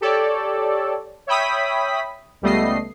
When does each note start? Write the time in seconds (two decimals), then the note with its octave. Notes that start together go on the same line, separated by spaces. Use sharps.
0.01 G4 A4 C#5 D5
1.27 C#5 E5 G5 B5 D#6 B6
2.42 C#2 G3 A3 B3 D#5 C7